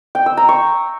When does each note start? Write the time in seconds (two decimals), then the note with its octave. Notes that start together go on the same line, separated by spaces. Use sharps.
0.15 G5
0.26 E6
0.37 A#5
0.49 C#6